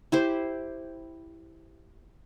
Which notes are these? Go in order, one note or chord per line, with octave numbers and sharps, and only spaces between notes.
E4 G4 C5